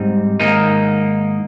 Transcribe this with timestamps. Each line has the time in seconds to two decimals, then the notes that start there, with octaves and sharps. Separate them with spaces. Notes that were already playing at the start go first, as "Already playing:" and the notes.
Already playing: G#2 G3 C4 D#4
0.40 G#2 D#3 A#3 D#4